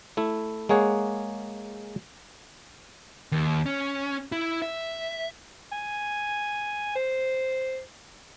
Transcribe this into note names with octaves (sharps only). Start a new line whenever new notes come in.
A3 E4
G#3 A#3 G#4 C#5 F#5
D#2
C#4
E4
E5
G#5
C5